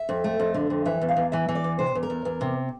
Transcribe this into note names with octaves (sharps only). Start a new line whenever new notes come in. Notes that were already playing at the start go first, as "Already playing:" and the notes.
Already playing: E5
F2
A3
F2
D3
F2
E3 E5
E2
F5
E2
E3 E5
E3
D5
E2
C3 C5
E2
A#4
E2
E2
C3